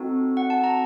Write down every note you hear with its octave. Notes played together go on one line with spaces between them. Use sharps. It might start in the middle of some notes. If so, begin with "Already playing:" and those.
Already playing: C4 D#4 F#4 A4
F#5
A5
A#5